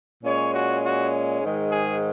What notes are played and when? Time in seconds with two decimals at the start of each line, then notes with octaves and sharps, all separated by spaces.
0.24 A#2 G#3 C#4 C#5
0.53 F#4
0.83 F#4
1.42 G#2 D#3 G#3
1.71 G#4